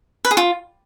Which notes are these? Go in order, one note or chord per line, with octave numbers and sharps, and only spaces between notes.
B4
G#4
F4